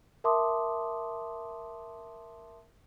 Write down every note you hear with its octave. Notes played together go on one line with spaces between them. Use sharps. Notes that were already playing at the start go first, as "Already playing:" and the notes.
A#4 E5 A5 C6 D6 D#6